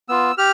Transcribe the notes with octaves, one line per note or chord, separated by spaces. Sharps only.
B3 F4 E6
G4 F6